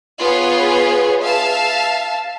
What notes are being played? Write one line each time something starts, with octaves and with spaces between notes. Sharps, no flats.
B3 F4 G#4 B4 C#5
E5 F5 A5